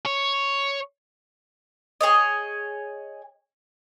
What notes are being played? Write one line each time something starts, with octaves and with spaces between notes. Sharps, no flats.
C#5
G#4 C#5 D#5